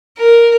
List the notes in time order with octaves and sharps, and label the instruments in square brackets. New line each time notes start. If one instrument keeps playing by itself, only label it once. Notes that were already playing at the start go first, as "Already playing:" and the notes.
[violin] A#4